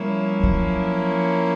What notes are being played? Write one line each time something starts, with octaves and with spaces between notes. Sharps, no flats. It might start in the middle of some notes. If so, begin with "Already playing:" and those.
Already playing: F3 G3 A#3 C#4 E4
F#3